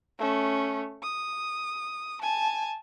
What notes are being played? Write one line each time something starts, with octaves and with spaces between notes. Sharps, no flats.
A3 C#4
D#6
G#5 A5